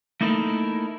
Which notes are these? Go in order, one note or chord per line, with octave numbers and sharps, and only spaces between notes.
A3 A#3 D#4 E4 A4 A#4